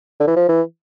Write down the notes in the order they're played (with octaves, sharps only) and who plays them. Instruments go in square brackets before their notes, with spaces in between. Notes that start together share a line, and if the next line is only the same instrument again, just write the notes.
[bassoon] D3
E3
F3
E3